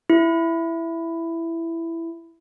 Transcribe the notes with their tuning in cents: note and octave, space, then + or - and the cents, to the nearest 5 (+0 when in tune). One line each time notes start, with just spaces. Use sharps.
E4 +10